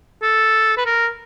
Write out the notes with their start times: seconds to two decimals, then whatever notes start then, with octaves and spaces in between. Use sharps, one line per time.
0.22 A4
0.77 B4
0.86 A#4